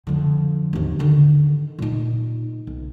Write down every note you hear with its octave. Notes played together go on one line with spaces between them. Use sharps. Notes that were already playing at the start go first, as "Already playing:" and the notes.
F2 D3
G#1 D#2
D3 D#3
A#2 D#4
B1